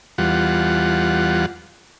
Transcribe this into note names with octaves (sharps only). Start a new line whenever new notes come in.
E2 G3 F4 F#5